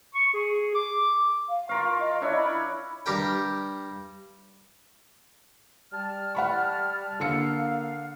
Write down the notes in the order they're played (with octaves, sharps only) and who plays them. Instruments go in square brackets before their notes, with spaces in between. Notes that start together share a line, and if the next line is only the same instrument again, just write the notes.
[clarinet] C#6
G#4
D6
[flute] F5
[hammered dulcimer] F4 A#4 F5 [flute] C#6
[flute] D#5
[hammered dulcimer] D4 E4 C#5
[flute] B5
[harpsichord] G2 G4 A#4 G5
[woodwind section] G3 A5 F6
[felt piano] F#5 B5 C#6
[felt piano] D3 A4 C#7 [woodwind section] A#3 F5